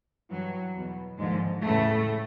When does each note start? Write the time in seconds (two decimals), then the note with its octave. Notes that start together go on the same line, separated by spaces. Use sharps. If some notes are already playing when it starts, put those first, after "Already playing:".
0.30 G2 E3 F#3
0.75 E2 B2
1.18 D#2 G#2 D3 F3 G#3
1.63 E2 A2 C#3 E3 A3